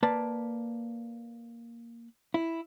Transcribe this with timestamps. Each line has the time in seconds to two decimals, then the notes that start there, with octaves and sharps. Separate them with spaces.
0.03 A#3 B4 D5 A5
2.34 E4